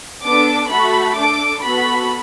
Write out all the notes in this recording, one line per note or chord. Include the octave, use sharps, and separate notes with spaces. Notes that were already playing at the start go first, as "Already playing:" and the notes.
B3 D4 A4 D6
A3 F#4 A4 B5
D4 A4 D6
B3 F#4 A4 B5